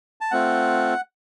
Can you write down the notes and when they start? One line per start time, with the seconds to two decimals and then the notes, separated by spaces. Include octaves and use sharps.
0.21 A5
0.31 A3 C4 F4 F#5